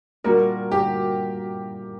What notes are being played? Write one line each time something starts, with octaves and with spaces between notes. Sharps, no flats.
A#2 G3 D4 F#4 A#4
G4